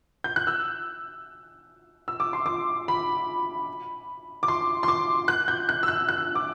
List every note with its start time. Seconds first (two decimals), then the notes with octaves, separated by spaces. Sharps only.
0.24 G6
0.36 F#6
0.47 E6
2.08 E6
2.20 D6
2.33 C6
2.46 D6
2.88 B5
4.43 D6
4.48 C6
4.83 C6
4.88 D6
5.28 F#6
5.48 G6
5.69 F#6
5.83 E6
5.88 F#6
6.09 F#6
6.35 D6